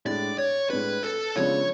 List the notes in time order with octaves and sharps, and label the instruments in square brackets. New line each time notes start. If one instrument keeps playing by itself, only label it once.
[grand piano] A2 G#3 D4 [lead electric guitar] D5
[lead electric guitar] C#5
[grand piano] A2 G#3 D4 [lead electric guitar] B4
[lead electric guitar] A4
[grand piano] C#3 F3 G#3 B3 D4 [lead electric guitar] C#5